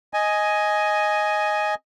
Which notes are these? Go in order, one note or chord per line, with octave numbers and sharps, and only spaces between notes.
D#5 G#5